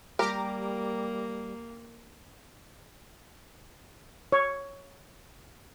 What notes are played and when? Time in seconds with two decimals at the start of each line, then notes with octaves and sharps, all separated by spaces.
0.19 G3 A#3 G4 A#4 A#5 D6
4.32 C#5